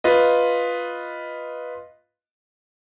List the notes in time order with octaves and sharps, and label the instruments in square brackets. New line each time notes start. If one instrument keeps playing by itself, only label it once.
[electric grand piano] F4 B4 D#5